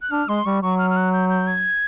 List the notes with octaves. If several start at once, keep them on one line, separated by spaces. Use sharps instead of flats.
F#6
D4 F6
G#3 C6
G3 C#6
F#3 C#6
F6
F6
F#6
G6
G6
G#6